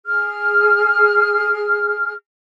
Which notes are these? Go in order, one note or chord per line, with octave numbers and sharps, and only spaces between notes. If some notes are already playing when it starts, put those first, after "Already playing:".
G#4 F6